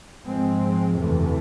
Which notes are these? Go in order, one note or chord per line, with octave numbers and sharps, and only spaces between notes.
G#2 F3 G#3 C4
F#1 E2 C3 E3 A3